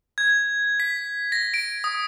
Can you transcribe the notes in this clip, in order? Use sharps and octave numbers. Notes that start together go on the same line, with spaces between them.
G#6
B6
A#6
D7
D#6